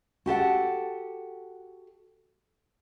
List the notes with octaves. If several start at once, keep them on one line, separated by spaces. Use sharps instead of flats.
F#4 G4 A4 F#5